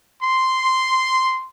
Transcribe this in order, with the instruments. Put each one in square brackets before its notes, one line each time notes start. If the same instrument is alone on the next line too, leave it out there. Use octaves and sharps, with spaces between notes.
[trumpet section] C6